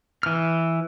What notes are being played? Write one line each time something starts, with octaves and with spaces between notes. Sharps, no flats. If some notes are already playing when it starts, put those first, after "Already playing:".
E3 F6